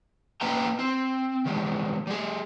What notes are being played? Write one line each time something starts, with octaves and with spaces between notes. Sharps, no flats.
A#3 C#4 B4 D#5 G5 A#5
C4
D#3 G3 G#3
G3 G#4